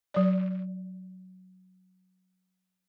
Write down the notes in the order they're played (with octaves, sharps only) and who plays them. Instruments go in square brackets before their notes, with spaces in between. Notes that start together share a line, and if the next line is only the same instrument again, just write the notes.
[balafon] F#3 D5